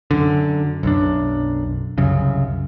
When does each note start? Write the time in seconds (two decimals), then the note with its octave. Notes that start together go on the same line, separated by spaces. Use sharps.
0.11 F#2 D3
0.83 B1 F#2 D4
1.98 C2 F#2 C#3